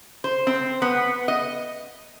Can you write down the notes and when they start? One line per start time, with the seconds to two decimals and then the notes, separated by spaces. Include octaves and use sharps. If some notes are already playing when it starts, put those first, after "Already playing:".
0.24 C5
0.47 C4
0.82 B3
1.28 D#5